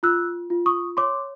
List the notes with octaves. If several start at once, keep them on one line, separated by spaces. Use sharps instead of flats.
F4 E6 F#6
F4
C#6 D#6
C#5 C6 D6